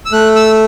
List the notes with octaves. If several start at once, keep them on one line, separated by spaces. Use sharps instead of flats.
E6
A3 F#6
E6